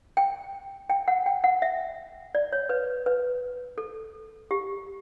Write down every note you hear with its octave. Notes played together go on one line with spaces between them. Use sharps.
G5
G5
F#5
G5
F#5
E5
D5
C#5
B4
B4
A4
G4